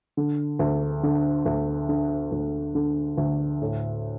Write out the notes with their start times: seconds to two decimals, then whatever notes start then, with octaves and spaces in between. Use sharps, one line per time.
0.17 D3
0.59 D2
1.03 D3
1.46 D2
1.89 D3
2.32 D2
2.75 D3
3.18 D2
3.62 A2